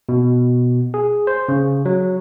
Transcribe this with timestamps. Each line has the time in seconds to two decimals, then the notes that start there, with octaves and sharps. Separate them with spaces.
0.09 B2
0.94 G#4
1.27 C5
1.49 C#3
1.85 F#3